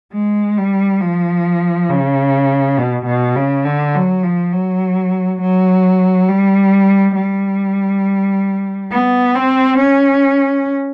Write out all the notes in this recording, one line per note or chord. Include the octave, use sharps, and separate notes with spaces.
G#3
G3
F3
C#3
B2
B2
C#3
D3
F#3
F3
F#3
F#3
G3
G3
B3
C4
C#4